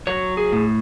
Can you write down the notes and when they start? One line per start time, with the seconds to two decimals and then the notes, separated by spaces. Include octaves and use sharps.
0.07 F#3 C#5
0.37 G#4
0.52 A2